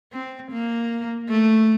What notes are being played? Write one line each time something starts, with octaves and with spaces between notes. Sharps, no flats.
C4
A#3
A3